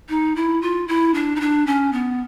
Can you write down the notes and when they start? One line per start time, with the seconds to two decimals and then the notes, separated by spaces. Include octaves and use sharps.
0.09 D#4
0.36 E4
0.62 F4
0.88 E4
1.14 D4
1.36 D#4
1.40 D4
1.67 C#4
1.92 B3